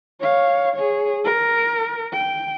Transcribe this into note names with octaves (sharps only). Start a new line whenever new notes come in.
C#5 F5
G#4 C#5
A#4
G5